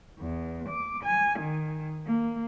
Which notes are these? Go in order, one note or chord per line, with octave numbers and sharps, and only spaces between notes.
E2
D6
G#5
D#3
A#3